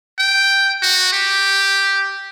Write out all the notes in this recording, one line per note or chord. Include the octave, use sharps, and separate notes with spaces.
G5
F#4
G4